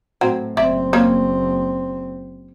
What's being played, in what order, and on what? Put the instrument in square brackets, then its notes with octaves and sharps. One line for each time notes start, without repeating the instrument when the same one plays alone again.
[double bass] A2 [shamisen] F#3 C4
[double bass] F#1 C4 [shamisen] D5 E5
[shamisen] A#3 C#4